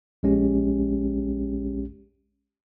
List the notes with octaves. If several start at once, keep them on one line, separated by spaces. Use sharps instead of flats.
A#1 G#3 C#4 G4